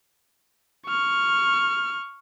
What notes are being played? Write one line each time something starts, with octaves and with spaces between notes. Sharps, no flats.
C#6 F6